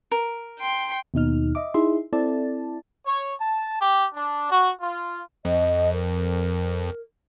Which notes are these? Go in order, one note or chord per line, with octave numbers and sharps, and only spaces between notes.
A#4
G5 C6
D#2 B2 D#4 F6
D#5 E5 D6
D#4 E4 G#4 E5 C6
C4 E4 A4 D5 A5
C#5
A5
G4
D4
F#4
F4
F2 D#5
A#4